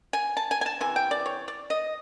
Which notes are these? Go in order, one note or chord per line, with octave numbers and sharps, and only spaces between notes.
G#5
A5
G#5
G#5
A5
C3 E3 G#5
G5
D5
C#5
D5
D#5